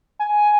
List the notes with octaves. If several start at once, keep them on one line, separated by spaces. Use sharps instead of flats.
G#5